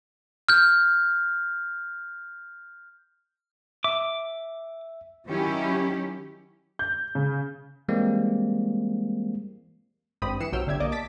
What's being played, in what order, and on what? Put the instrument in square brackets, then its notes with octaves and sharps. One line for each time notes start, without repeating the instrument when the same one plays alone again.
[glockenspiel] F6 G6
[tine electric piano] E5 [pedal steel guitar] D6
[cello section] D#3 F#3 C#4 E4 G4
[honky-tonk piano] G6
C#3
[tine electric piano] E3 G3 G#3 A#3 C4
[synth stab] G#1 G2 C4 G4 B5 D#6
E3 C7 C#7 E7
B1 C3 F#3 G5 E6 F6
G1 C2 D3 G4 E5 G#6
B1 A#3 D5 D#5 D6
A5 D6 A6 B6